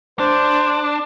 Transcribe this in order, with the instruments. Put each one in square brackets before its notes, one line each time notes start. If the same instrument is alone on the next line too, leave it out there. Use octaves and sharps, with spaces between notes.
[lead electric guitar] D4 [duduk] C5